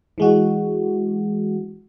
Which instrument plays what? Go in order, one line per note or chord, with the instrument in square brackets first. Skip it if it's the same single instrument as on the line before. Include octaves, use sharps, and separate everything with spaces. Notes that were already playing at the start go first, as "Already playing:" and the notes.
[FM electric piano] E3 G#3 F#4